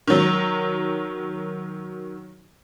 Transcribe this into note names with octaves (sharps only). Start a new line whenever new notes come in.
D#3 F#3